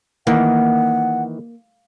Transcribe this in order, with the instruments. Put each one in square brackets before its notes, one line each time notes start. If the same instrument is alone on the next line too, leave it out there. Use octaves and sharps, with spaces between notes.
[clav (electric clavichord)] D#3 E3 [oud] A#3 [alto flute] F#5